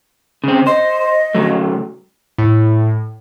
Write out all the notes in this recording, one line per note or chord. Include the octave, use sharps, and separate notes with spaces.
C#3 C4
C5 D#5
C#3 F#3 A3
A2